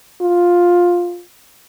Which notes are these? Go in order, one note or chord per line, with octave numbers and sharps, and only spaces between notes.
F4